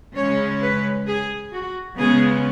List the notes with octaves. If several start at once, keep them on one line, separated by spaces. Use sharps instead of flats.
C#3 G#3 C#4 C#5
B4
G#4
F#4
C#3 G#3 B3 G#4